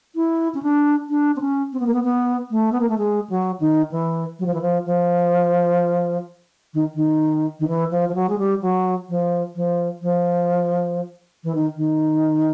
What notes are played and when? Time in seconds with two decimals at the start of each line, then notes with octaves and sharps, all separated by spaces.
0.15 E4
0.55 C#4
0.63 D4
1.10 D4
1.36 C4
1.41 C#4
1.73 C4
1.80 B3
1.87 A#3
1.94 B3
2.04 B3
2.51 A3
2.72 B3
2.81 A#3
2.89 A3
2.98 G#3
3.30 F#3
3.60 D#3
3.92 E3
4.39 F#3
4.46 F3
4.54 E3
4.61 F3
4.86 F3
6.74 D#3
6.95 D#3
7.60 D#3
7.68 E3
7.91 F3
8.09 F3
8.15 F#3
8.29 G#3
8.38 G3
8.62 F#3
9.09 F3
9.56 F3
10.02 F3
11.44 E3
11.55 D#3
11.76 D#3